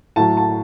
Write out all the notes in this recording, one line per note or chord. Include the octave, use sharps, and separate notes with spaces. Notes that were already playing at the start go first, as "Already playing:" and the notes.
A2 F#3 A5
A5